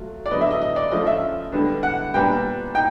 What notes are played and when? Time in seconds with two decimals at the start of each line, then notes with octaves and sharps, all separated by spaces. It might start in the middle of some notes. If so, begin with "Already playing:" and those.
Already playing: F#3 A3 F4
0.26 D5
0.31 D3 F#3 B3 D#5
0.41 E5
0.51 D#5
0.62 D#5
0.76 D5
0.91 F3 A3 C#4 F4 D#5
1.07 E5
1.52 D3 G3 B3 D4
1.83 F#5
2.14 A#2 G3 B3 D4 G5
2.75 D#4 G5